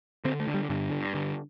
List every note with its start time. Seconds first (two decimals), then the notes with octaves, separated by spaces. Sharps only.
0.25 D3 C4
0.40 A3
0.47 D3
0.54 G3
0.70 G2 D3
0.92 G2
1.14 D3